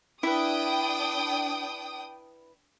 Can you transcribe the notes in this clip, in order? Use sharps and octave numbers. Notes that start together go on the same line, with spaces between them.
D4 E4 B4 G5 D#6